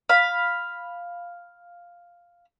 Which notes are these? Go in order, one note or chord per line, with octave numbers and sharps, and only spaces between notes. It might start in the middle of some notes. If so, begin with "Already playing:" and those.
F5 B5